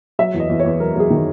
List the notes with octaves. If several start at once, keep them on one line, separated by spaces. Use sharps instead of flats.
F#3 E5
E2
D#5
E2
C#5
E2
F#3 A#4
F#3 G#4
D#3